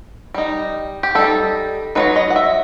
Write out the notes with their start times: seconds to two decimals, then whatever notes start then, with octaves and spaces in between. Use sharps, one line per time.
0.34 G3 D#4
1.03 G4
1.15 G3 D#4 A4
1.95 F#3 C4 D#4 B4
2.16 D#5
2.30 F#5
2.36 E5